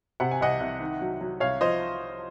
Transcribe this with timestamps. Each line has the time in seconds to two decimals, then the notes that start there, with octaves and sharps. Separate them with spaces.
0.20 C3 F#5
0.31 G#5
0.41 C2 D#5 F#5
0.60 C2
0.81 D#3
1.01 F#3
1.21 F#3
1.40 C2 C#5 F5
1.61 F3 C5 D#5